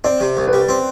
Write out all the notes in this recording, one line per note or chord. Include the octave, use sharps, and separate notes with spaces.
C4 D5
C3
C2
B4
G3
C4 C5